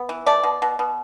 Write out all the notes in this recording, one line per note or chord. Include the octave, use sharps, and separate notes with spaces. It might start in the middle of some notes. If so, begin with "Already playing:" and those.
Already playing: B3
E3
A3 D5
B2
B2
B2